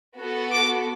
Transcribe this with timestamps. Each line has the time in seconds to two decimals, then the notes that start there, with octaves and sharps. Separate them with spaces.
0.19 B3 F#4 A4
0.53 D6